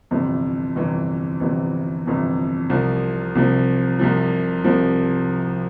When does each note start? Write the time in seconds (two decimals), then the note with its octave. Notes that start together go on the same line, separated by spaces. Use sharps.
0.11 G1 F2 C3 E3
0.76 G1 F2 C3 E3
1.40 G1 F2 C3 E3
2.06 G1 F2 C3 E3
2.70 C2 C3 F3
3.35 C2 C3 F3
3.99 C2 C3 F3
4.64 C2 C3 F3